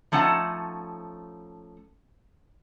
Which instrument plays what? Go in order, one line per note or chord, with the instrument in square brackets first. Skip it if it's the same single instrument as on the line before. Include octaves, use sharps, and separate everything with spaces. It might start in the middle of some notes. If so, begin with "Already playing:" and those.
[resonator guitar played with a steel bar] F3 A3 C#4 D#4 F#5 A5